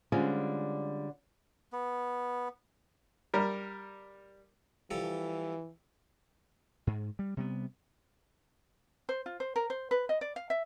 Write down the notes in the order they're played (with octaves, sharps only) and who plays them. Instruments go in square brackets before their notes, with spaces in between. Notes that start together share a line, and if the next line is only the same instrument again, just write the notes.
[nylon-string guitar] D3 G3 G#3 C4 C#4 F4
[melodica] B3
[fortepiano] G3 A#4
[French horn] E3 [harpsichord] F3 G3 A4
[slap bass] G#2
G3
C3 G3 B3
[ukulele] C5
F4
C5
A#4
C5
B4
D#5
D5
F5
E5